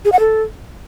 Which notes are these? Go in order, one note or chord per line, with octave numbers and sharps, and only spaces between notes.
G#4
F#5
A4